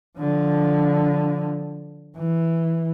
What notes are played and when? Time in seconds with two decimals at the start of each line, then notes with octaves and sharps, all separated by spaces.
0.19 D3 F3
2.18 E3